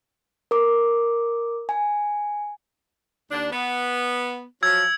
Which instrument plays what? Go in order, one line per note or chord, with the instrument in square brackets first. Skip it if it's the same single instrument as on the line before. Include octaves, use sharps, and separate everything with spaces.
[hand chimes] A#4 D6
G#5
[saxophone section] D#2 D4
B3
[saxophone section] F3 F#3 [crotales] E6 G#6